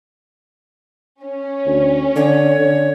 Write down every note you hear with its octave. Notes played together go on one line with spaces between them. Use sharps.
C#4
D2
D3 C#5
D3